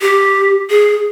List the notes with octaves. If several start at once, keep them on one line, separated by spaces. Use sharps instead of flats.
G4
G#4